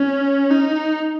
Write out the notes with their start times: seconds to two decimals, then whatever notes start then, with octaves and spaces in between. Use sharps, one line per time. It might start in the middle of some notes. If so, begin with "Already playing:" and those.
Already playing: C#4
0.50 D#4